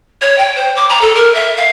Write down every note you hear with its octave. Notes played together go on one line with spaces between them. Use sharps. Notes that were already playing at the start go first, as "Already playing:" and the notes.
C#5
G5
C5
D6
A#5
A4
A#4
E5
F5